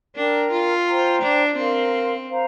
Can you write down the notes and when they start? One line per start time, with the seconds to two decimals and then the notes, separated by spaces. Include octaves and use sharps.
0.15 D4 A#4 G5 A#5
0.51 F4
0.87 C5 G5 A#5
1.22 D4
1.57 C4 A#4 F5 C6
2.27 C5 F5 A#5